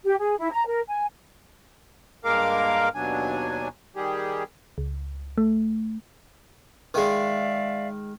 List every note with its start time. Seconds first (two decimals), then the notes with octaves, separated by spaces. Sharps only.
0.05 G4
0.19 G#4
0.39 E4
0.52 A#5
0.67 A#4
0.88 G#5
2.25 G2 G#3 A#3 A#4 F5 D6
2.94 D#2 B2 F#3 D4 G#5
3.96 D#3 G3 G4 G#4
4.78 C#2
5.38 A3
6.94 D#3 G#3 D5 E5 F5